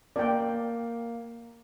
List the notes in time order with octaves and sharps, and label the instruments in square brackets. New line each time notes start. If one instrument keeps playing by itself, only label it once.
[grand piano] A#3 [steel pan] D5 G5